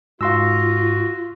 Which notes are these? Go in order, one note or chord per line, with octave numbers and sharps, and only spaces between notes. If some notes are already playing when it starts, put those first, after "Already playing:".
G#2 F4 F#4 F5 C6 E6